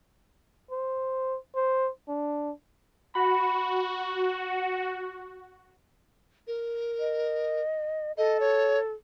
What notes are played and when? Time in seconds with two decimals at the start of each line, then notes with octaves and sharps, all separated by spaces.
0.71 C5
1.55 C5
2.08 D4
3.15 F#4 B5
6.47 A#4
6.99 D#5
8.17 A4 D#5
8.40 C#5